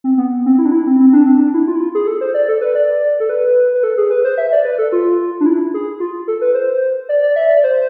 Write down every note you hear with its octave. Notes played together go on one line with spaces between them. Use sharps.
C4
B3
C4
E4
D4
E4
C4
C4
D4
C4
D4
E4
F4
E4
F4
G#4
A4
C5
D5
A4
B4
D5
A4
B4
B4
A4
G#4
B4
C5
E5
D5
B4
A4
F4
D4
E4
G#4
F4
A4
B4
C5
D5
D5
E5
D5
C5